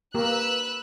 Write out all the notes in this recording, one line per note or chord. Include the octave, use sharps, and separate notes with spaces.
A#3 G4 A#4 B4 E6 F#6